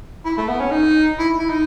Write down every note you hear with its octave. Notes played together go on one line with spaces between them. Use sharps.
E4
A3
B3
C#4
D#4
E4
E4
D#4